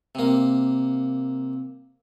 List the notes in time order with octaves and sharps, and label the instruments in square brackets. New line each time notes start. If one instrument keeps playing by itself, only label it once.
[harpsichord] C3 A#3